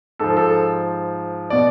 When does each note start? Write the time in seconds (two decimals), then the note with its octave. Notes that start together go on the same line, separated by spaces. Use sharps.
0.19 G#2 F3 A4
0.37 A4
1.50 B2 D5